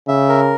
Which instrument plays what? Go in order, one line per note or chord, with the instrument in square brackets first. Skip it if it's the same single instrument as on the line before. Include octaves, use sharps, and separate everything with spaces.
[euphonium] C#3 [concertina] E5
[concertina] A#4